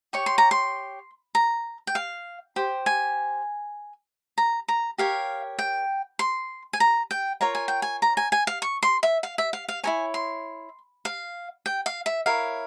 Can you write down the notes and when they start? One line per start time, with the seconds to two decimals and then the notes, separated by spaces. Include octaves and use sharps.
0.13 G4 C#5 C#6
0.26 C6
0.38 A#5
0.51 C6
1.35 A#5
1.87 G5
1.95 F5
2.56 G4 C5
2.86 G#5
4.38 A#5
4.68 A#5
4.98 G4 A#4 C#5 F5
5.59 G5
6.19 C6
6.73 G#5
6.80 A#5
7.11 G5
7.41 F4 A#4 C#5 A#5
7.55 G#5
7.68 G5
7.82 G#5
8.02 A#5
8.17 G#5
8.32 G#5
8.47 F5
8.62 C#6
8.83 C6
9.03 E5
9.23 F5
9.38 E5
9.53 F5
9.69 F5
9.83 E4 A#4 C#5 G#5
10.14 C6
11.05 F5
11.66 G5
11.86 F5
12.06 E5
12.26 E4 A#4 C#5 F5